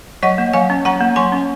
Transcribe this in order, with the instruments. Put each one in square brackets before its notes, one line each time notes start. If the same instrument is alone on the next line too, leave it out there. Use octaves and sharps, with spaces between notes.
[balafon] F#3 D#5 F#5
A#3
F#3 F5 G#5
C#4
F#3 F#5 A#5
A#3
F#3 G#5 C6
C#4